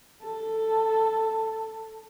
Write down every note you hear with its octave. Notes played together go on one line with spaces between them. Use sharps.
A4